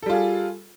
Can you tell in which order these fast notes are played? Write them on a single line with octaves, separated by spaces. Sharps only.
A4 G3 F4 G#4